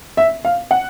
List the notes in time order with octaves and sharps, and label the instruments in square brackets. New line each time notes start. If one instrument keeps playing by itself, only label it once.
[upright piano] E5
F5
F#5